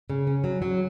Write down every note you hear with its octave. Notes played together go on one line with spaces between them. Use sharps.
C#3
C#4
F#3
F#3